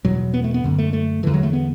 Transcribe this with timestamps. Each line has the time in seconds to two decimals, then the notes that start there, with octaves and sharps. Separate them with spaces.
0.05 E2 B2 F#3
0.34 B3
0.44 A3
0.54 B3
0.64 F#2 D3
0.79 A3
0.93 A3
1.23 E2 D3 E3
1.34 F#3
1.43 A3
1.53 B3